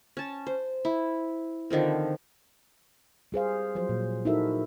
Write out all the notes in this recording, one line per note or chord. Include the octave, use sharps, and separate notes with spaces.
C#4 A5
C5
E4
D3 D#3 F3 C4
G3 G#4 C5 F5
F3 F#3 C5
A#2
D#4 E4 F#4 A4 A#4 E5